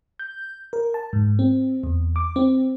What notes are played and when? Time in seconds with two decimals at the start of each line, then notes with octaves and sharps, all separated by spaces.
0.19 G6
0.73 A#4
0.94 A5
1.13 G#2
1.39 C4
1.83 E2
2.16 D6
2.36 C4